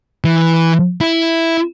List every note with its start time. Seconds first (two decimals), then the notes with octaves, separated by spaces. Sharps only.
0.24 E3
1.01 E4